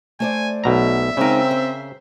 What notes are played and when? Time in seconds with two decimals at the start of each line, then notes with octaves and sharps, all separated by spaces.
0.20 A3 C5 D5 G#5
0.64 B1 B2 E5 A#5
1.17 C#3 G#3 C4 D#4 A#4
1.51 C5